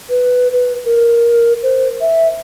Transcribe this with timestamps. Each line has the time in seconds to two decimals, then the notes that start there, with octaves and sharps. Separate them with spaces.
0.10 B4
0.52 B4
0.85 A#4
1.63 C5
2.01 E5